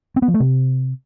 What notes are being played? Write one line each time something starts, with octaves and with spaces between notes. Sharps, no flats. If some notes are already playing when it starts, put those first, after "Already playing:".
C4
B3
F3
A3
C3